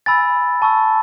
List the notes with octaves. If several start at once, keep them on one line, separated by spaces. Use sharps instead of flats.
G#5 B5 E6 A6
A5 C#6 E6